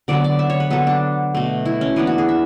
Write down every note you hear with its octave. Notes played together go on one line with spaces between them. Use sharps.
D3 F#3 B3 D5
D5
E5
C#5
B4
D3 F#3 B3 A4
D4
B2 A3
E4
C#4
E3 B3 D4
F#4
G#4
E5